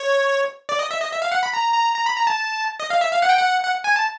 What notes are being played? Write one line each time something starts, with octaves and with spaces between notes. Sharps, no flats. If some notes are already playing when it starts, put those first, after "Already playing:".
Already playing: C#5
D5
D#5
E5
D#5
E5
F5
F#5
B5
A#5
A#5
A#5
B5
A#5
A5
D#5
F5
E5
F5
F#5
G5
F#5
F#5
G#5
A5